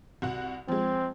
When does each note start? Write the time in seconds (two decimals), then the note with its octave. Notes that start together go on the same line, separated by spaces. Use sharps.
0.22 C2 F#4 F#5
0.68 F3 G#3 C4